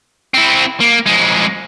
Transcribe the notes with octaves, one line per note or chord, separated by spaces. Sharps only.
C4 E4
A#3
F2 G#3